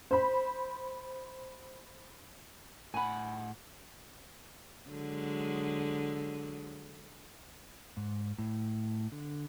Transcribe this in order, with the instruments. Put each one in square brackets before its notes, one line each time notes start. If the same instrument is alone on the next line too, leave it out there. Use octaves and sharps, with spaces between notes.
[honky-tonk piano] C5 B5
[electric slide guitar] A2 F#5 [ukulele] G#5 B5
[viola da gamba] D3 F#3 G#3
[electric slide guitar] G#2
A2
D3